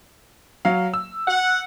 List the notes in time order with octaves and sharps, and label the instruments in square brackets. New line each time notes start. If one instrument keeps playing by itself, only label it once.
[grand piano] F#3 F5
E6
[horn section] F#5